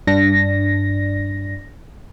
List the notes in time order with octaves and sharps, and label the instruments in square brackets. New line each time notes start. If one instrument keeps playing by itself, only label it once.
[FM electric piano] G2 D4 A#6